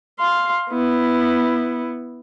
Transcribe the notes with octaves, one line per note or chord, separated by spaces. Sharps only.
F5 C6
B3 E4